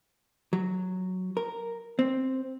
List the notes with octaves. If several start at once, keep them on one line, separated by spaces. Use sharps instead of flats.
F#3
A#4
C4